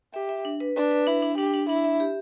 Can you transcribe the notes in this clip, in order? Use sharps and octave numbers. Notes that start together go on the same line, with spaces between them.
G4 E5
E5
D4
B4
D4 B4
B4
D4 E4
D4
D4 G4
D4
D4 E4
E5
G4